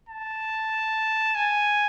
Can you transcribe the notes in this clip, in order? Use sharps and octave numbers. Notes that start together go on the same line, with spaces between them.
A5
G#5